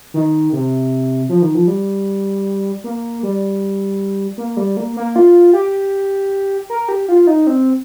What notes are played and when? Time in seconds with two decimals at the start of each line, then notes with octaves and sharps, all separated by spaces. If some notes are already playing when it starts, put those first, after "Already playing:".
0.14 D#3
0.53 C3
1.29 F3
1.42 D#3
1.55 F3
1.67 G3
2.84 A#3
3.23 G3
4.38 A#3
4.57 G3
4.77 A#3
4.97 A#3
5.16 F4
5.53 G4
6.70 A#4
6.88 G4
7.08 F4
7.27 D#4
7.47 C4